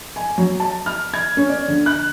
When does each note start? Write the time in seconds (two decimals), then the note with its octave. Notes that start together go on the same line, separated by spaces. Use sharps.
0.16 G#5
0.38 F#3
0.60 A5
0.86 F6
1.14 G#6
1.37 C#4
1.49 D5
1.68 D3
1.86 F#6